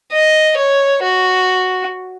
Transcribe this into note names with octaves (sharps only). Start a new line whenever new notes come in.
D#5
C#5
F#4